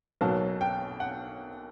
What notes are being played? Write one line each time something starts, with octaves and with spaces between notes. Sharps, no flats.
B1 B2 F#3 A#3 A5
G5
F#5